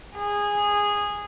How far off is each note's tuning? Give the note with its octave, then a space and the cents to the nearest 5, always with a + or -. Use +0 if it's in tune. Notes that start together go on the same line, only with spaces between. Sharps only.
G#4 -15